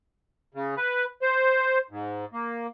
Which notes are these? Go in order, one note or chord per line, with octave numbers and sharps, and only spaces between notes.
C#3
B4
C5
G#2
A#3